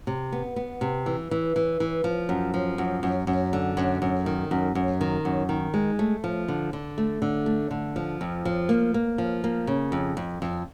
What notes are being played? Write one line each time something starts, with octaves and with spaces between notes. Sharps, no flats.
C3
B3
B3
C3
E3
E3
E3
E3
F3
F#2
F3
F#2
F#2
F#2
D3
F#2
F#2
D#3
F#2
F#2
D#3
F#2
D#3
G#3
A3
F3
D3
D3
A3
D3
A3
D3
F3
F2
F3
A#3
A#3
F3
A#3
C#3
F2
F2
F2